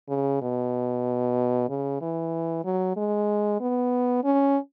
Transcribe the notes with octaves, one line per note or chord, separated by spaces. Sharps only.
C#3
B2
C#3
E3
F#3
G#3
B3
C#4